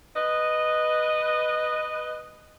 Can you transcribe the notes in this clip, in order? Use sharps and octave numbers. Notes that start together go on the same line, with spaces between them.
B4 D#5